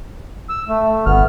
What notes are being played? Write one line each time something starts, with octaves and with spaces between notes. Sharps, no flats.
E6
A3
G#1 B3 F6